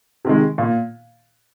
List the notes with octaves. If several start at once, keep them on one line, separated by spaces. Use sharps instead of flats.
C3 D#3 G#3
A#2